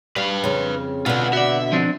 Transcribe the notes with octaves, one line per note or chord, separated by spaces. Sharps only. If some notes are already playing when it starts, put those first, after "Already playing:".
G3 B4 F5
F2 C#3
B2 D3 F4 B4
F#4 D5 E5
F3 C4 D4